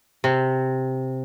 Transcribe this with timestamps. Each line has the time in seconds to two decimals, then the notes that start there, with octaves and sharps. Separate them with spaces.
0.24 C3